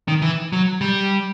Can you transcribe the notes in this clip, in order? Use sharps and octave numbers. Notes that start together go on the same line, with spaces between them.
D#3
E3
F#3
G3